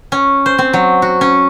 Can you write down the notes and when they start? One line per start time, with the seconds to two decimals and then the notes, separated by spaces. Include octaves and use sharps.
0.12 C#4
0.46 C5
0.58 C4
0.73 F#3
1.02 F#4
1.21 C#4